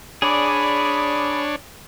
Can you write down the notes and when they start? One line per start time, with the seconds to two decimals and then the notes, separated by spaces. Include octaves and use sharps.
0.22 D4 G#4 C#5 D5 B5